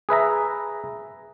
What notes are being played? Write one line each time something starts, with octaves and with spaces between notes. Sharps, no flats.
G#4 B4 E5 A#5